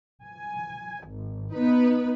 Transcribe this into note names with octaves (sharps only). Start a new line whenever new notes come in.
G#5
G#1
B3 D#4 B4